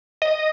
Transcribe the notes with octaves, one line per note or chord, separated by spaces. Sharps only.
D#5